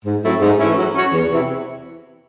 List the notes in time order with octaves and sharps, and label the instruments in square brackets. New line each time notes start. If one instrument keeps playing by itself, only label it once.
[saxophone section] G#2
F#3 A3 C4 E4
G#2
E3 A3 C#4 E4
F#3
C#4 F#4 C#5
E2
C3 E3 C4 E4